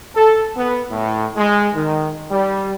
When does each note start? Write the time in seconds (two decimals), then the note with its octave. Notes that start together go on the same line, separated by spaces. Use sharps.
0.15 A4
0.56 B3
0.91 A2
1.36 G#3
1.75 D#3
2.30 G3